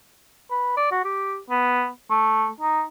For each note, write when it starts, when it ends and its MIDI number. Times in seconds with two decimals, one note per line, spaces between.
0.51 0.77 71
0.77 0.87 74
0.91 1.01 66
1.04 1.38 67
1.50 1.88 59
2.10 2.49 57
2.60 2.82 63